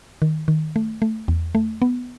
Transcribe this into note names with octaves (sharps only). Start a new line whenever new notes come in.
D#3
D#3
A3
A3
E2
A3
B3